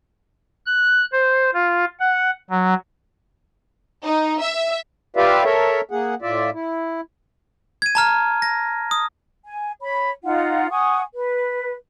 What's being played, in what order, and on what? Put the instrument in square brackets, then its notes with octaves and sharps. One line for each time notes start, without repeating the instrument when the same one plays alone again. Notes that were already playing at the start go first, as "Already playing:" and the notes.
[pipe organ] F#6
C5
F4
F#5
F#3
[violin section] D#4
E5
[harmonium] F4 G4 B4 D5 E5 F5
A4 A#4 C#5 E5
A#3 G#4 F#5
A2 F4 D5 E5
E4
[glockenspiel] G#6 D#7
A5 A#5 F6
A#6
D#6
[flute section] G#5
C#5 B5
D#4 F4 F#5
F#5 G#5 C#6 D#6
B4